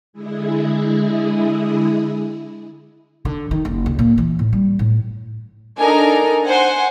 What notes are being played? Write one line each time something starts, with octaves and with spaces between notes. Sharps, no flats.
D3 G#3 E4 G#4
D3
D#3
F#1
C#2
A#2
E3
A2
G3
A2
D4 D#4 A4 A#4 G#5 A#5
C5 F#5 G#5